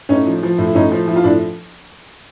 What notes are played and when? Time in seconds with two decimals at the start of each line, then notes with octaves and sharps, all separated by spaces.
0.09 A2 C#4 D#4
0.27 F3
0.43 F3
0.58 A2
0.67 E4
0.75 A2 C#4 D#4
0.91 F3
1.08 F3 E4
1.16 F4
1.24 A2 D4 E4